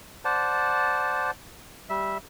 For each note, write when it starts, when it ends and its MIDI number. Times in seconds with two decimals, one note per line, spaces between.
0.25 1.31 72
0.25 1.31 74
0.25 1.31 78
0.25 1.31 81
1.90 2.18 55
1.90 2.18 76